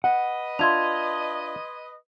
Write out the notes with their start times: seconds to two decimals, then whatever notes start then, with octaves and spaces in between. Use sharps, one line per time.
0.04 B4 D#5 F#5
0.59 D4 F4 E5 C6 G#6 F7